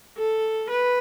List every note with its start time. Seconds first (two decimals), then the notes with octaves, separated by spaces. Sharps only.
0.18 A4
0.70 B4